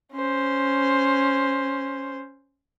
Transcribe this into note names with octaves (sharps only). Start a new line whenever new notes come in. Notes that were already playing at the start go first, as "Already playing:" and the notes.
C#4 C5